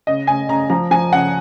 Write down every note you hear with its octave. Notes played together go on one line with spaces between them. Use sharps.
C#3 D#5
C#3 G#5
C#3 A#5
F3 A#5
F3 G#5
C#3 F#5